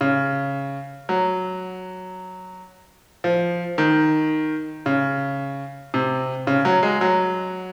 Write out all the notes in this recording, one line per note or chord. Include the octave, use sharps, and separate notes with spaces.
C#3
F#3
F3
D#3
C#3
C3
C#3
F#3
G#3
F#3